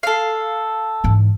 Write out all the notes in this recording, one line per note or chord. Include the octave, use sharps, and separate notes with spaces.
A4 F5
G#2 E3